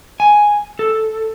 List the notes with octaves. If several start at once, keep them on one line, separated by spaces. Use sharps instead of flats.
G#5
A4